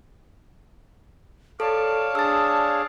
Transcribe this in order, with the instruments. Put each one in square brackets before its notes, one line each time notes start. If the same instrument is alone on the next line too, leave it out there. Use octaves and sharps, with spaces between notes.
[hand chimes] A4 [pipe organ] C#5 D5 F5 [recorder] A5
[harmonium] D4 G#4 [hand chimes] E6 A6